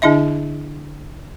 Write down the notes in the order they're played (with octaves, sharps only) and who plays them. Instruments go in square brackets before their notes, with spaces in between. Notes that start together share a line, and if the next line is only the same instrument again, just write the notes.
[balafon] D3 D4 E4 D#5 E5